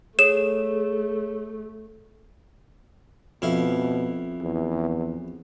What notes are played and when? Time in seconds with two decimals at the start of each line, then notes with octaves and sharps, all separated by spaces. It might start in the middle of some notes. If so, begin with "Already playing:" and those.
0.19 A3 G#4 C#5 E7
3.42 F2 B2 E4 F5
4.41 E2